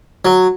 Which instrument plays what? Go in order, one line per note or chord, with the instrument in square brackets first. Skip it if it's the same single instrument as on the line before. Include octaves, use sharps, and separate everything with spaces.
[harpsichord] F#3